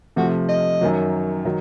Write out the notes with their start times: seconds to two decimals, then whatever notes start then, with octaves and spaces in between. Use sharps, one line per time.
0.16 C3 F3 A3 F#4
0.49 D#5
0.81 F#2 D#3 F#3
1.45 D#3 F#3